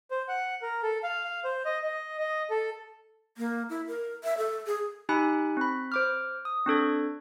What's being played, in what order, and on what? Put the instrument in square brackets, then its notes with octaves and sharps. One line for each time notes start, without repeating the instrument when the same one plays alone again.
[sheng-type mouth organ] C5
F#5
A#4
A4
F5
F5
C5
D#5
D#5
D#5
A4
[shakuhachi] A#3
E4
A#4
E5
A4
G#4
[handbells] D#4 G4 G#5 B5 F#6
C4 B5
C5 D6 F6
D#6
C4 D4 A4 G#6